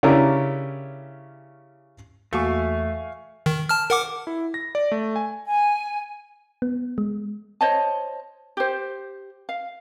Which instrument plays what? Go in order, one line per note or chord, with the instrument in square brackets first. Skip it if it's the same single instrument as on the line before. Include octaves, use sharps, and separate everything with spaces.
[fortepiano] C#3 C#4 D4 E4 G4 A#4
[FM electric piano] E2 A#3 F#4 [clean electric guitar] A3 [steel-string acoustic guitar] E5 [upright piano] F5 G#5 C#6
[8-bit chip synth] D#3
A5 F6
A#4 F#5 D6
[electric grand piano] E4
A#6
D5
A3
G#5
[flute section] G#5
[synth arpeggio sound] B3
G#3
[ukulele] C5 C#5 D#5 A5
G4 C5
F5